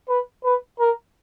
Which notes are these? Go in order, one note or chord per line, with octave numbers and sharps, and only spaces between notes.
B4
B4
A#4